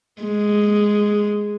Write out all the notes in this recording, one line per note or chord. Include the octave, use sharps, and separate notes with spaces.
G#3